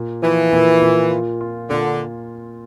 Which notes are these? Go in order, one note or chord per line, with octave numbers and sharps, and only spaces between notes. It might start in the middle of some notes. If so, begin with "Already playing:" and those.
Already playing: A#2
E3 F3
A#2
A#2
F4
F4
A#2 D3